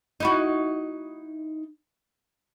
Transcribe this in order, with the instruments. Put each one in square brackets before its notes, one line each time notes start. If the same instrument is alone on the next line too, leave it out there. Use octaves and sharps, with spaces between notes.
[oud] D#4 E4 F#4